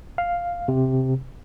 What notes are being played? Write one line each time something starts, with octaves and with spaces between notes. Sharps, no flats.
F5
C3